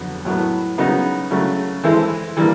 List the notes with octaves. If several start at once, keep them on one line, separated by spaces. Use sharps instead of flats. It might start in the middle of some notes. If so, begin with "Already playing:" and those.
Already playing: F2 D3 F#3 B3
A2 F#3 B3
C#3 F#3 B3 D#4 F#4
C#3 F#3 A3
E3 G#3 C4 E4 A4
E3 G3 A#3